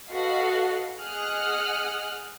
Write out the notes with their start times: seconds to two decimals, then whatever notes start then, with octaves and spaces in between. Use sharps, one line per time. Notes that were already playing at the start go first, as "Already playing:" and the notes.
0.10 F#4 A4 B4 D#5 F5 F#5
0.99 G#4 D#5 F#5 D#6 F6 F#6